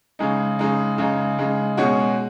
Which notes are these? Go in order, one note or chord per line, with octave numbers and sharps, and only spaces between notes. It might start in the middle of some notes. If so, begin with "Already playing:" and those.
C#3 G#3 D#4
C#3 G#3 D#4
C#3 G#3 D#4
C#3 G#3 D#4
B2 G#3 C#4 F#4